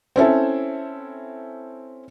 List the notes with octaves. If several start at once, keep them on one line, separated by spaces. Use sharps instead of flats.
C4 C#4 E4 A4